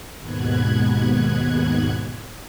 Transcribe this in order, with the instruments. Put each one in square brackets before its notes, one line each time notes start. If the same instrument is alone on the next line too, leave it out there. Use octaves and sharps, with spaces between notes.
[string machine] D#2 G#2 B2 B3 F#6 G#6